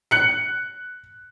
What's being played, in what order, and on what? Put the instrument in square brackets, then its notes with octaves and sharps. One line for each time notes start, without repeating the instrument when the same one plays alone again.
[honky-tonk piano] F#6 C#7